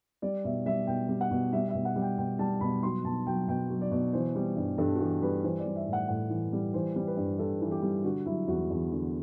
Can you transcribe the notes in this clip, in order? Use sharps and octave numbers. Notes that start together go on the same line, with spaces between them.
G3 D5
B2 E5
G3 E5
B2 G5
G3
F#5
B2
G3 E5
E5
B2
F#5
G3
G5
B2 G5
G3 A5
B2 B5
F#3 C6
B2 A5
F#3 G5
B2 G5
F#3
D5
B2
E3 C5
G3
G2
G2 A4
F#4
E3 G4
G3 B4
E3 C5
D5
G3
E5
A2
F#5
A2 F#5
E3
G3
E3 C5
G3
B4
G2
G2 A4
E3
G4
G3
D3 F#4
F#3 E4
E2 F#4
E2
D3